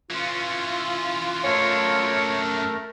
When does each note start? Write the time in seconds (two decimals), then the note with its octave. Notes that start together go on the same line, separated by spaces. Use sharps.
0.11 E3 C#4 F4
1.44 F#2 A3 D4 A#4 C#5